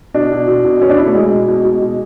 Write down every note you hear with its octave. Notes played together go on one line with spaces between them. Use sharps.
B2 D4
B2
B2
B2
B2 C#4
D4
B2 E4
A3
B2 G#3
B2
B2
B2
B2